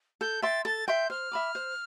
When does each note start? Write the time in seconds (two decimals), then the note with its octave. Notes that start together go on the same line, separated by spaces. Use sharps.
0.21 A4 G6
0.42 E5 G5 C6 A6
0.65 A4 A6
0.88 E5 G5 C6 G6
1.10 C5 F6
1.32 E5 B5 D6
1.55 C5